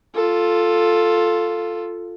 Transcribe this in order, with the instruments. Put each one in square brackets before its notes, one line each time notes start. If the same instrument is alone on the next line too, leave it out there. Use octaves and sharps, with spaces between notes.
[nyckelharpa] F4 A4